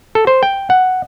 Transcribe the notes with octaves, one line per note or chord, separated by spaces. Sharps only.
A4
C5
G5
F#5